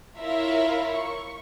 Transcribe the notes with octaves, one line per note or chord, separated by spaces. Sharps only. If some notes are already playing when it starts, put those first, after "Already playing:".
E4 F4 A#4 C#5 E5 F5
C#6